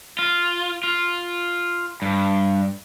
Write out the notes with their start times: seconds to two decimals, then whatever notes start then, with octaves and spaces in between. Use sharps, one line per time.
0.19 F4
0.83 F4
2.02 G2